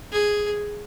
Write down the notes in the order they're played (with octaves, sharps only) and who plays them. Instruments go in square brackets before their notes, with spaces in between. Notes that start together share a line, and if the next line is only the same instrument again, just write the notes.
[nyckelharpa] G#4